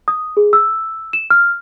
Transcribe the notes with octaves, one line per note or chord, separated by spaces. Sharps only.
D#6
G#4
E6
E7
F6